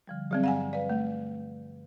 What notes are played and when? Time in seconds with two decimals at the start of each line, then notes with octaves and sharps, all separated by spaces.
0.07 D3 F3 G3
0.31 F#3 G3 C4 G#4 D5
0.44 G2 F5 F#5 G#5
0.73 B4 D5 F5
0.90 A3